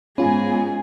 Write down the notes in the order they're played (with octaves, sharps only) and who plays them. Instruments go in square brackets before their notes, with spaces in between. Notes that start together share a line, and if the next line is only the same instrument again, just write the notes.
[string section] G#2 [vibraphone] B3 [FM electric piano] C#4 F4 [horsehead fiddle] G#4 G#5